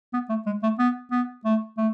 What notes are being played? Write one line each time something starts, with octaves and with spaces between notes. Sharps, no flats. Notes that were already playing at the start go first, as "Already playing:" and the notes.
B3
A3
G#3
A3
B3
B3
A3
A3